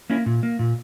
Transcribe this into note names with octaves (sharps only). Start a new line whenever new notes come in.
A#3 C#4 E4
A#2
A#3
A#2